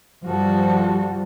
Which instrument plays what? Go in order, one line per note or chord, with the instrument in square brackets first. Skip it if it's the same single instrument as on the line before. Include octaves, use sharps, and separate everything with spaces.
[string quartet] G2 F#4 A4 [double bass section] F3 G3